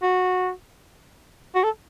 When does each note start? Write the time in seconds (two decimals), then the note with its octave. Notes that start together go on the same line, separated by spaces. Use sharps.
0.02 F#4
1.55 F#4
1.63 A4